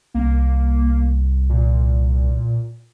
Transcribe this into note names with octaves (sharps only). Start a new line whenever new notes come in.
C2 A#3
A#2